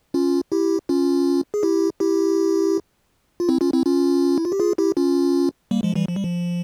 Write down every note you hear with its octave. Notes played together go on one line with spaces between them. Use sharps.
C#4 F4
E4 G4
C#4 F4
G#4
E4 G4
E4 G4
F4
C4 E4
C#4 F4
C4 E4
C#4 F4
E4
F4
G4
F4 G#4
E4 G4
C#4 F4
G3 A#3
F3 G#3
E3 G3
F3
G3
F3